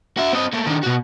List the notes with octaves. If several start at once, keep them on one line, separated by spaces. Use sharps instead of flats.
F#4 E5
C4 D#5
A3 A#3
D#3 D4
B2 F#4